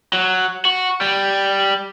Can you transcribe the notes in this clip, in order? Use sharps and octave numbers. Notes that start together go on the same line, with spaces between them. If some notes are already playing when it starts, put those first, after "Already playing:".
F#3
F#4
G3